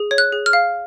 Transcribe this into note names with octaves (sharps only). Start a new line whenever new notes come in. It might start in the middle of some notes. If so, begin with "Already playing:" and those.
Already playing: G#4
C#5
F#6
G#4
F6
F5